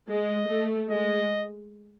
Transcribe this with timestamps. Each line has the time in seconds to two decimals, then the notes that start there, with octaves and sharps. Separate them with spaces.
0.10 G#3 D#5
0.50 A3
0.90 G#3 D#5